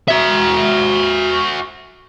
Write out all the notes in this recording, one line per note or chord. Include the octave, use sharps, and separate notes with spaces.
F#4 E5